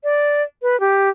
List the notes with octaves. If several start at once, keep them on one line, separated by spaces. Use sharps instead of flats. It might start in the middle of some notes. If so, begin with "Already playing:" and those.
D5
B4
G4